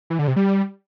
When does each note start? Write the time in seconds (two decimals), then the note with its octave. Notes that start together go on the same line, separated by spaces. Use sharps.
0.10 E3
0.19 D3
0.28 C3
0.36 G3